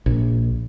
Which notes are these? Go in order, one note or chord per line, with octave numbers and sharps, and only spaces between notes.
A#1